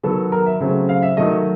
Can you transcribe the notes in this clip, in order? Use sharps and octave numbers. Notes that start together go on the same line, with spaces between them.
D#3 F#3 B3 A4
A#4
E5
C#3 F#3 A3 C4
F5
E5
D#3 F#3 A3 D#5